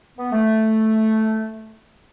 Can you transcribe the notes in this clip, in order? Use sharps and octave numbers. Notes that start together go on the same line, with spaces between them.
B3
A3